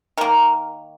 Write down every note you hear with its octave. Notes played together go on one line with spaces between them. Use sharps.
D#3 A#3 A#4